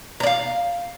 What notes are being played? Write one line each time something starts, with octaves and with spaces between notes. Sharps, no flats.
D5 F5 A#5